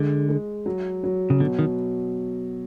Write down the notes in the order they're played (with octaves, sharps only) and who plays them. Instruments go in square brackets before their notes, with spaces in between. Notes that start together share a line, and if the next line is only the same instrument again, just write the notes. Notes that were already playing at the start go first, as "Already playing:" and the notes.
Already playing: [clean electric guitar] D3 [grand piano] G#3
[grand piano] G#3
F#3
F#3
[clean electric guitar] C#3
[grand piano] B2 [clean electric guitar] D3
[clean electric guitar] D#3